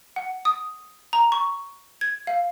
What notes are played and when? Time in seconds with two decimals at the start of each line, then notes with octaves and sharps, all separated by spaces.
0.16 F#5
0.45 D#6
1.13 A#5
1.32 C#6
2.01 G#6
2.27 F5